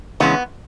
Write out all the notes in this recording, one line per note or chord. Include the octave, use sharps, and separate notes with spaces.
C#3 E3 G#3 B3 C#4